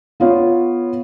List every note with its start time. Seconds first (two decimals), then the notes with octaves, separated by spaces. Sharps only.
0.20 B3 F4 C#5